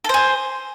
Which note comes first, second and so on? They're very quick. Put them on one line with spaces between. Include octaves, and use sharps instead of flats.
A4 C5 G#4